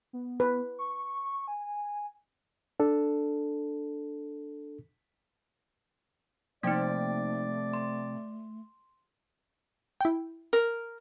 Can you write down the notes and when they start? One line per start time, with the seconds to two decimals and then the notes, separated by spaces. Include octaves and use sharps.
0.13 B3
0.40 B4
0.79 C#6
1.48 G#5
2.80 D4 A4
6.63 C3 F3 A3 A#3 D#4 D5 G5
7.73 C6
10.01 E4 G5
10.53 A#4